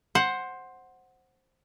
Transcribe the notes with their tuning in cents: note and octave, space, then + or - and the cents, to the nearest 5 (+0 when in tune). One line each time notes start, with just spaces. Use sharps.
C5 +10 F#5 +0